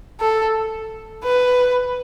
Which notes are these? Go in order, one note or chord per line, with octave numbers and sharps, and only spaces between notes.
A4
B4